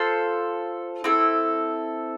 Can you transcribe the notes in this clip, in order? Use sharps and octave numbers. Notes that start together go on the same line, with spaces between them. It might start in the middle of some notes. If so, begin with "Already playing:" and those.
Already playing: F4 A4 C5
C4 E4 A4